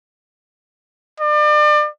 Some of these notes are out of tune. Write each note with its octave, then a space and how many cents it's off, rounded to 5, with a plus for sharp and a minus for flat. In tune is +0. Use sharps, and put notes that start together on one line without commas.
D5 +35